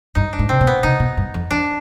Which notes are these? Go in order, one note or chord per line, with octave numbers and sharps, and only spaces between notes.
G2 D#4
D4
G#2
C3 C4
B2
B3
C3 D#4
B2
G2
F2
F2 D4